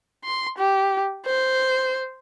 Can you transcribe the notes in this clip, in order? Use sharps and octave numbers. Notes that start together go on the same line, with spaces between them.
C6
G4
C5